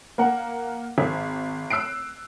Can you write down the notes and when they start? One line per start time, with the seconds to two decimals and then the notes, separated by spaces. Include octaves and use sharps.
0.18 A#3 A#4 F#5
0.98 G#1
1.70 E6 F#6 C7 D7